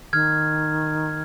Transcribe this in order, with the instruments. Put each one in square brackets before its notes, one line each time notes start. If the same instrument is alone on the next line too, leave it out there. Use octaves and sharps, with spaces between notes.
[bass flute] D#3 [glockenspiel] F6 G#6